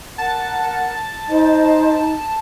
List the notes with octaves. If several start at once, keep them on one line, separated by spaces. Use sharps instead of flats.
A#4 F#5 A5
D#4 C5 D#5